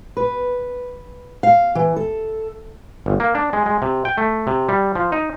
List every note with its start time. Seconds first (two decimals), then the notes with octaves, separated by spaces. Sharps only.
0.17 B4
1.43 F5
1.75 E3
1.96 A4
3.06 G1
3.20 A#3
3.35 D4
3.53 G#3
3.66 G#3
3.82 C3
4.05 G5
4.18 A3
4.47 C3
4.69 G3
4.95 F3
5.12 D#4